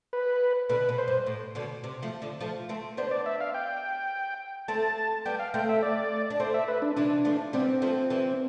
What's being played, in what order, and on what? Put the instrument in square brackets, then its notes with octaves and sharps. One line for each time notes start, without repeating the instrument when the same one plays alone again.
[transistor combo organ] B4
[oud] B2 D3 [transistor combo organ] B4
[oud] B2
[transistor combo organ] C5
[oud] G2
A2
B2 D3
C3
F3 A3
D3 F3
F3 A3
A3 C4
[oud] B3 D4 [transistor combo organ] C5
[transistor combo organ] D5
E5
F5
G5
[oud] A3 C4 [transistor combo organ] A5
[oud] G3 B3 [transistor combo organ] G5
[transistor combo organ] F5
[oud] A3 C4 [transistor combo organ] G5
[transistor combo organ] E5
D5
[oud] D4
[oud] A3 C4 [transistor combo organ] C5
[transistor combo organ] E5
B4
D4
[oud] C3 E3 [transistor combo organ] D4
[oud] F3 A3
[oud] G3 B3 [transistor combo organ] C4
[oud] F3 A3
E3 G3